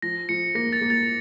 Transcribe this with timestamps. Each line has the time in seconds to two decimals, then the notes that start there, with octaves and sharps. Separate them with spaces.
0.02 F3 A#6
0.29 F3 C#7
0.55 A#3 A#6
0.73 A6
0.81 A#3
0.90 A6